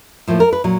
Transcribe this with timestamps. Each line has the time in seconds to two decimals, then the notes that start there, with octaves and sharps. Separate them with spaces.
0.28 A2 F3 A#3
0.40 A#4
0.53 B4
0.64 A#2 F#3